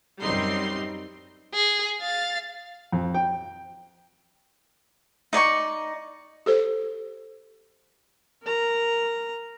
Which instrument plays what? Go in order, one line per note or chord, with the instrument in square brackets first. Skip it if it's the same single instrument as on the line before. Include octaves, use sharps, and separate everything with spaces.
[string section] F#2 G3 C4 D#4 C6 C7
[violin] G#4
F5 A6
[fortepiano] F2
G5
[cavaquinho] D#4 D5 G#5 C#6
[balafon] G4 A4 C5
[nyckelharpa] A#4 A#5